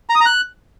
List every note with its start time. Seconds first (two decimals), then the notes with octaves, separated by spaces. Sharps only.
0.10 A#5
0.15 D#6
0.20 A#5
0.26 F#6